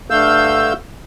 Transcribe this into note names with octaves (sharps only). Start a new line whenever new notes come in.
G2 D3 A3 F5 E6 G6